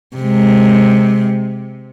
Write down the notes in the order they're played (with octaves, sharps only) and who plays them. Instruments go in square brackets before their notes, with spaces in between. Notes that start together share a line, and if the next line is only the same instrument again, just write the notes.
[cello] C3 G#3